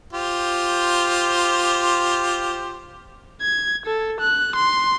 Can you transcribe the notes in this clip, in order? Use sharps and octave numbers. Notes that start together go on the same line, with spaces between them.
F4 G4 C5
G#6
A4
F#6
C6